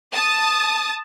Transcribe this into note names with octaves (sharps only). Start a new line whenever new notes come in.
A5 D#6